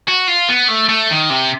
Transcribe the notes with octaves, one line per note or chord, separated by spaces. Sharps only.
F#4
F4
B3
A3
A3
D#3
C3